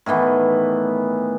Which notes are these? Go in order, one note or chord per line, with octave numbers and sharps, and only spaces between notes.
A2 D#3 E3 B3